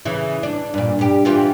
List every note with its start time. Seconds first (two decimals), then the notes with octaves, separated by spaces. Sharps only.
0.05 C#3 E3 E4
0.43 D4
0.74 G2 A#2
0.99 G2 G4
1.25 E3 F4 G4